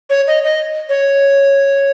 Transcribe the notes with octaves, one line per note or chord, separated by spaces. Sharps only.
C#5
D#5
D#5
C#5